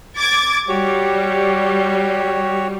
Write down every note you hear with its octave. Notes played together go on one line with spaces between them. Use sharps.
D6 G#6 A6
G3 F#4 G4 C#5